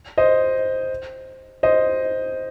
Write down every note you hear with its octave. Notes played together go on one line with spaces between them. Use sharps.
C5 D#5
C5 D#5